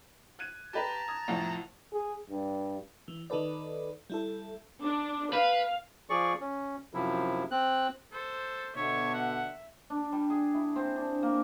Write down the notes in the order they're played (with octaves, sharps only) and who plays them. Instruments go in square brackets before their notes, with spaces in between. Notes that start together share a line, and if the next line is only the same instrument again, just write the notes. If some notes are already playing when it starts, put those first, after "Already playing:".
[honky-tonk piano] F#6 G#6 D#7
[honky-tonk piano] G4 B4 [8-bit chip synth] A5 A#5
[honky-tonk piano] D#6 G#6
C2 F2 A2
[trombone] G#4
G2
[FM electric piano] E3
D#3 D#4 A4 B4 D5
G3 E4 A4
[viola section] D4
[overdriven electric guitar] B4 [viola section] F5
[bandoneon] F3 G#4 D5 C#6
C#4
F#2 C3 F3 E4
C4 F#6
[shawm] A4 [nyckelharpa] C5
[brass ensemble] B2 D3 [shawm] C#5 [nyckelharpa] E5
[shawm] F#5
[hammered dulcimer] D4
G3
G#4
E4
C4
D4
A#3